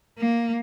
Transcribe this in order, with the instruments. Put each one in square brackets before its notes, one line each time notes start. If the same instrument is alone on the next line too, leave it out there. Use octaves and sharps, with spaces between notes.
[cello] A#3